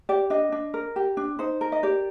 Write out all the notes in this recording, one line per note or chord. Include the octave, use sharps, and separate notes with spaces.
G4 D5
D4 D#5
D4
A#4
G4
D4
D#4 C5
A#4
D#5
G4 D5